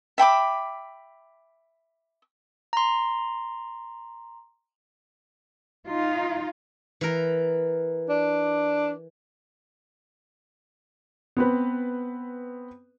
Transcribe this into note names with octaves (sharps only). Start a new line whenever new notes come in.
E5 G5 B5 D6
A#5 C6
D#4 F4
E3 A#4
D4
B3 C4 B4